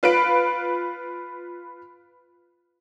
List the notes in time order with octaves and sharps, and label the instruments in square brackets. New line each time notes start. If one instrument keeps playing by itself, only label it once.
[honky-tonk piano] F4 B4 B5 D7